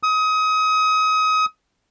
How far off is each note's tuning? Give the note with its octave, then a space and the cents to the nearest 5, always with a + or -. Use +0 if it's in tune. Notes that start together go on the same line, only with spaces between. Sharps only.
D#6 +30